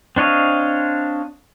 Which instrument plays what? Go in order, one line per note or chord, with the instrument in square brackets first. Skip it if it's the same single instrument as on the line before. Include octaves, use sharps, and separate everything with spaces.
[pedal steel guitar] C4 D4 C#5 D#5 F5